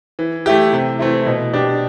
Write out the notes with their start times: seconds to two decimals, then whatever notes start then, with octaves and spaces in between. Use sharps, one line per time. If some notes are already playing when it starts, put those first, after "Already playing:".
0.19 E3
0.46 A3 E4 G4
0.73 C3
0.99 E3 A3 C4 E4
1.26 B2
1.53 B3 D4 G4